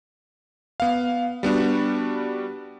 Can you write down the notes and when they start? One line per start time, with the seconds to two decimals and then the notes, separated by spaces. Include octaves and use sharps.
0.80 B3 F5
1.43 G3 B3 D4 F#4